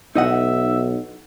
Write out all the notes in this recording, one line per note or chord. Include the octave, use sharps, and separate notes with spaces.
B1 D#4 D#5 E5 F#5